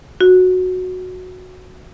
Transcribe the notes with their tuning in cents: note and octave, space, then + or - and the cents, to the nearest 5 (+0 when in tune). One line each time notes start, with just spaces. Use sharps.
F#4 -10